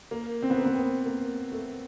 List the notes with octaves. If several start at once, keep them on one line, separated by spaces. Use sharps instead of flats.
A#3
C4
B3
A#3
B3
C4
A#3
A3